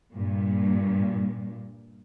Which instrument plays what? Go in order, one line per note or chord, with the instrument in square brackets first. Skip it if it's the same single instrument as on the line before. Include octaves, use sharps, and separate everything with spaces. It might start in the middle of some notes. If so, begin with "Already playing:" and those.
[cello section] G2 A#2